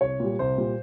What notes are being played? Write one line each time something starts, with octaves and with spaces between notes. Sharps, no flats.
C2 C#5
A#2 G3
C2 C5
A#2 G3